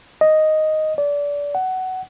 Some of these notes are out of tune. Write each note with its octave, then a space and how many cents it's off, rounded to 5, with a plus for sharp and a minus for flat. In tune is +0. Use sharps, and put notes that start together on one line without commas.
D#5 +0
D5 -25
F#5 +15